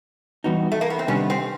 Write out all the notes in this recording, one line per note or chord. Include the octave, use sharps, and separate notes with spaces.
E3 G3 B3 D#4 F#4
A3
A#3
B3
C4
C3 D#3 G3 B3 C#4 D4
C4